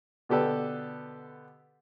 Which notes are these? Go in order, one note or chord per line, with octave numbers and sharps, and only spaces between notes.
B2 D3 G4 A4 B4